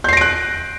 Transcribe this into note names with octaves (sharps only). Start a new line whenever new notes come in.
F#6 G6 A#6 C7 D7